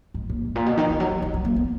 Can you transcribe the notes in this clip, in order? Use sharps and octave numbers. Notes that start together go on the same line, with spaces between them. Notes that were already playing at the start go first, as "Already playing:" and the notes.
G#2
A#2
G#2
A#2
B2
D#3
E3
F#3
E3
E3
F#3
A#3
B3